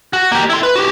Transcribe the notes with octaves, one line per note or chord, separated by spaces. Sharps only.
F#4
A#3 G4
E4 C6
B4
F#4 G4